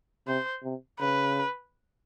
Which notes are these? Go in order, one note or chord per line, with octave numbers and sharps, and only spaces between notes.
C3 C5
C3
C#3 B4